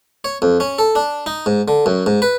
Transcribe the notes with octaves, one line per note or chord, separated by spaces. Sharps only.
C#5
F2
C#4
A4
D4
D#4
G#2
D3
F#2
G#2
B4